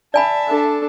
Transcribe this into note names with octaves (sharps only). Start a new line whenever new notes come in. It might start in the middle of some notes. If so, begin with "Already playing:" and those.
D5 E5 G#5 A5 B5
D4 A4